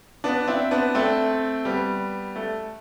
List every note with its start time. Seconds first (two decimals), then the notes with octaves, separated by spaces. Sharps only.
0.24 B3 D4
0.47 C4 E4
0.71 B3 D4
0.95 A3 C4
1.65 G3 B3
2.36 A3